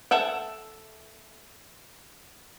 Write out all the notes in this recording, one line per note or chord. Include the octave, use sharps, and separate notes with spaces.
A4 E5 F#5 G5